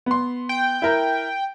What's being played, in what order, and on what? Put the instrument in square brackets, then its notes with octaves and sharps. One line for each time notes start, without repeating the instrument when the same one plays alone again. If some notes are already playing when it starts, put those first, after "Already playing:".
[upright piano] B3 C6
[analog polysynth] G5
[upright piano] E4 A#4